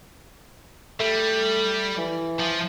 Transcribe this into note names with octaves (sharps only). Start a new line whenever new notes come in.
G3 A3
E3
F3